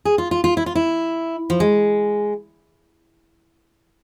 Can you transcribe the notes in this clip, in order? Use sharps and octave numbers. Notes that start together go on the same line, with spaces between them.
G#4
F4
F4
F4
E4
F4
E4
F3
G#3